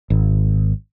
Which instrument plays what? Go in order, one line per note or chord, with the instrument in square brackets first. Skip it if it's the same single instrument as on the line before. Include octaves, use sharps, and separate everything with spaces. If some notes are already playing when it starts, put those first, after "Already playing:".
[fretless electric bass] G#1